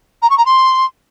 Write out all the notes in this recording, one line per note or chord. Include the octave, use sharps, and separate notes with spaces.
A#5
C#6
A#5
C6